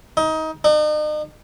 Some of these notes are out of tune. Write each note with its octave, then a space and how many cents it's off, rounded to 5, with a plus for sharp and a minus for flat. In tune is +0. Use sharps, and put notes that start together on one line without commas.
D#4 +25
D#4 -40